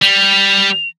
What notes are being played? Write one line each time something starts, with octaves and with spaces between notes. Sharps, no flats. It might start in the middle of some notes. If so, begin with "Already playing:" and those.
G3 F7